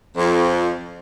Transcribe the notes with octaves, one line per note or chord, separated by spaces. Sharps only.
F2